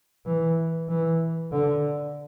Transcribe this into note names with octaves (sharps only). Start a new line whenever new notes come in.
E3
E3
D3